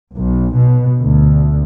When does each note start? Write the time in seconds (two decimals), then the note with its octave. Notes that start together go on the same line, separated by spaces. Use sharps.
0.15 B1
0.57 B2
1.02 D2